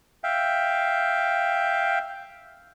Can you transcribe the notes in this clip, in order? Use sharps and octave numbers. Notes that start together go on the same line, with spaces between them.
E5 F5 G5